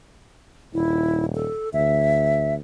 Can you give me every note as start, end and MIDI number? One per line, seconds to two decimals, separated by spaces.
0.74 1.47 27
0.74 1.25 64
1.35 1.69 69
1.73 2.59 38
1.73 2.54 76